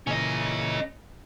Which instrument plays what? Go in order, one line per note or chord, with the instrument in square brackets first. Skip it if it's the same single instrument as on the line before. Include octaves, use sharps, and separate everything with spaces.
[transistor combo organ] A#2 C#3 E3 [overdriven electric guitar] C#4 D#5